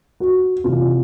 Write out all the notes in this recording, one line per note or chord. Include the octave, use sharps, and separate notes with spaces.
F#4
C3 E3 F4